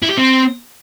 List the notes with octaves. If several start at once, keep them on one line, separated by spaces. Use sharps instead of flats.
E4
G4
C4